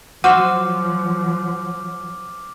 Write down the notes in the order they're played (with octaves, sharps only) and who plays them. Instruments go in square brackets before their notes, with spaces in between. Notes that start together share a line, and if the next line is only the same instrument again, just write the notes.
[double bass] F3 F#3 [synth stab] F#4 C5 E6 [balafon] F#5 [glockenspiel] D6 F6